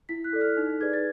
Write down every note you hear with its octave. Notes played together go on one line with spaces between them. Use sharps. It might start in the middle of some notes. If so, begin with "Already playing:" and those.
E4 B6
F#6
A4 D5
F6
D#4
G#4 B4 D5 G#6
A6